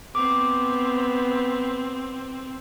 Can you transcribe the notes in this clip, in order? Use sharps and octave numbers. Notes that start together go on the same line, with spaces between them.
B3 C4 D6